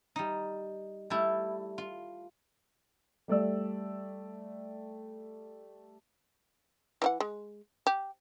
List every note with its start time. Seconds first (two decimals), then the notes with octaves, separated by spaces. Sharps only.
0.16 G3 D#4
1.10 G3 A3 E4
1.78 F4
3.28 G3 A3 D5 E6
7.02 E3 D#4 F#5
7.20 G#3
7.87 G4